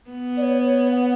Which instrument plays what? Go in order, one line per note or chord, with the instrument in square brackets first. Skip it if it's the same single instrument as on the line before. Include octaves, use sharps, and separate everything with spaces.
[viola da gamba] B3
[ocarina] D5
C#5
C#5
F#5